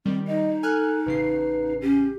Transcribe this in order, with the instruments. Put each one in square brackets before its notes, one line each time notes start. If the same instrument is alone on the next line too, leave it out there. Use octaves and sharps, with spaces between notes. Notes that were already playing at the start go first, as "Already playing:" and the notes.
[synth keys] D#3 G3 [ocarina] C4
[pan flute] D#4 [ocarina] D#5
[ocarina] A4 [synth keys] G#5 F6 F#6
[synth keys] A1 C#3 C7 [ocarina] B4
[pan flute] C#4 [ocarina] G4